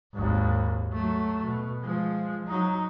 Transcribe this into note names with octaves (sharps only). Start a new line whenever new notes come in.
G#1 D#2
F#3 A3
B2
F3 G#3
F#3 D#4